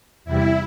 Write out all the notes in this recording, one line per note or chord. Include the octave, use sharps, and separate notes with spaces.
E2 C3 G3 E4